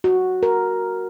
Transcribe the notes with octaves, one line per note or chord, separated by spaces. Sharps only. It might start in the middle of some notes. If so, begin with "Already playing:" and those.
F#4
A#4